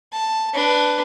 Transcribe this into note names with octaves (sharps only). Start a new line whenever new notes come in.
A5
D4 B4